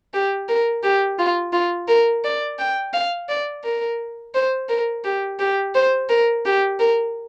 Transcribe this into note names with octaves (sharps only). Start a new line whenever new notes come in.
G4
A#4
G4
F4
F4
A#4
D5
G5
F5
D5
A#4
C5
A#4
G4
G4
C5
A#4
G4
A#4